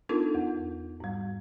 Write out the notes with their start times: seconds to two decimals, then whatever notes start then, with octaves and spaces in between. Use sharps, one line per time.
0.09 B3 D4 D#4 F4 A4 A#4
0.35 E2
1.00 G#2 G3